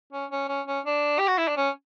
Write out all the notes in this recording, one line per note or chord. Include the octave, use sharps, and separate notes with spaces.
C#4
C#4
C#4
C#4
D4
G4
F#4
E4
D4
C#4